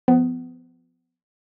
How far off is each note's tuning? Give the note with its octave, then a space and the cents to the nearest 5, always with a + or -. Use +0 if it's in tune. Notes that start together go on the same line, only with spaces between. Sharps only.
F3 +0 B3 +25